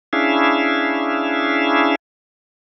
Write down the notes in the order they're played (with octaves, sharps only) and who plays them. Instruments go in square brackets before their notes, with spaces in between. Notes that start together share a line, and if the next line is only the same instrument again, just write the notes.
[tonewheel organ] C#4 D4 E4 G#4 E5 F5